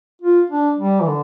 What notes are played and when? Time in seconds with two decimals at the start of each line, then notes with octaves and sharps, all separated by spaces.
0.22 F4
0.50 D4
0.78 G3
1.01 E3
1.07 D3